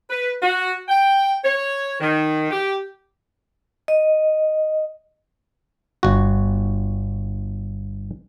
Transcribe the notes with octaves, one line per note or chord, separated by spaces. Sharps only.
B4
F#4
G5
C#5
D#3
G4
D#5
G1 F#4